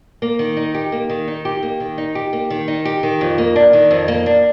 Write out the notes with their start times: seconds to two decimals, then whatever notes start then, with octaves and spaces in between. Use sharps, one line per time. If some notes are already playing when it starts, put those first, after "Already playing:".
0.22 A#3
0.39 D#3
0.57 D#4
0.74 G4
0.92 A#3
1.10 D#3
1.28 D#4
1.45 G4
1.63 A#3
1.80 D#3
1.98 D#4
2.15 G4
2.33 A#3
2.50 D#3
2.68 D#4
2.85 G4
3.03 D#3
3.21 F2
3.38 A#3
3.56 D4
3.73 D#3
3.91 F2
4.08 A#3
4.26 D4